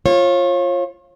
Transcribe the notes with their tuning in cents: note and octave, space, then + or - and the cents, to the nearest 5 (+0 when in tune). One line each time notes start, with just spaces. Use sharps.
F4 +0 C#5 -35